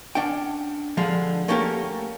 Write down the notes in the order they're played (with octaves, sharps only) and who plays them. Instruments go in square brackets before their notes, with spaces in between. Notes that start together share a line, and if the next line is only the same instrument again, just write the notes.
[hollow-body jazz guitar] C#4 D4 F#5 G5
D3 F3 G3 G#3 F5
A3 A#3 C#4 G4 A4 A#4